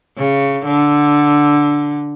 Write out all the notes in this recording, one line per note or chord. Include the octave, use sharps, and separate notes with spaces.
C#3
D3